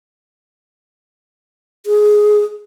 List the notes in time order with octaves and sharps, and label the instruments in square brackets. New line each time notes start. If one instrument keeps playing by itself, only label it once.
[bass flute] G#4